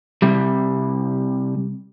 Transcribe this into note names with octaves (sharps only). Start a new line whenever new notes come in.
C3 G3